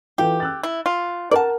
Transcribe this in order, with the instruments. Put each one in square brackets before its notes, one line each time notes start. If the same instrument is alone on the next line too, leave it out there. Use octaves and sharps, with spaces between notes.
[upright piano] E3 F4 A4 [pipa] G4
[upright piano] E6 F#6 A6
[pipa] E4
F4
[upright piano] A#4 F#5 [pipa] D5 A5